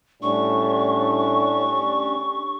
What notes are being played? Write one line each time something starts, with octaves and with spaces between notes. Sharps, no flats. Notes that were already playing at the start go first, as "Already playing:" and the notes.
A2 G3 C#4 D4 C#6